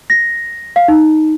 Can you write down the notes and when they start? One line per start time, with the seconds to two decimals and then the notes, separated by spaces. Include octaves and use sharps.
0.10 A#6
0.76 F5
0.88 D#4